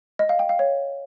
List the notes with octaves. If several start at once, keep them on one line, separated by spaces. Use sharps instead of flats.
D#5
F5
G5
F5
C#5